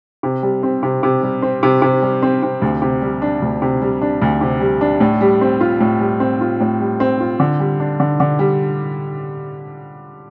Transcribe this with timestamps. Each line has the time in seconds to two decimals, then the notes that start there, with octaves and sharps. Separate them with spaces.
0.23 C3
0.43 G3
0.63 C4
0.83 C3
1.03 C3
1.23 G3
1.42 C4
1.63 C3
1.82 C3
2.02 G3
2.22 C4
2.43 C3
2.62 D2
2.82 C3
3.02 G3
3.22 D4
3.42 D2
3.62 C3
3.82 G3
4.02 D4
4.22 D2
4.41 C3
4.61 G3
4.81 D4
5.00 A2
5.21 G3
5.41 C4
5.61 F4
5.80 A2
6.01 G3
6.20 C4
6.41 F4
6.60 A2
6.80 G3
7.00 C4
7.20 F4
7.40 D3
7.60 G3
7.80 D4
8.00 D3
8.20 D3
8.39 G3